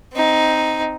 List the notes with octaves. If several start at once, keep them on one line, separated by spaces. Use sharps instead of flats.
C4 D#4